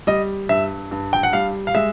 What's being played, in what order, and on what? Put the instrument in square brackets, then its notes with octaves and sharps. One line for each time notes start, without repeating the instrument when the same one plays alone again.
[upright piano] G3 D#5
G2 E5
G2
G5
F#5
G3 F5
F5
G#3 E5